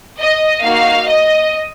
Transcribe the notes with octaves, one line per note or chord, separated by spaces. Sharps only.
D#5
A#3 D#4 F#4 F5
D#5